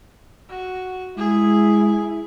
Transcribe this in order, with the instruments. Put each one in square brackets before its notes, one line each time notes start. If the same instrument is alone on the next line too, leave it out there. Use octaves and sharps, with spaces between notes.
[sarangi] F#4
[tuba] G#3 [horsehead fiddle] E4 [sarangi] G#4